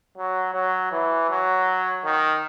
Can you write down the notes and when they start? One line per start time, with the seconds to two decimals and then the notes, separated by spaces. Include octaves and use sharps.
0.17 F#3
0.54 F#3
0.92 E3
1.30 F#3
2.04 D#3